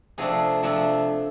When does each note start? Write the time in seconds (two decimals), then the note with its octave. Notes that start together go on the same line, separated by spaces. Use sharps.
0.18 C3 F3 A3 D4 G#4
0.63 C3 F3 A3 D4 E5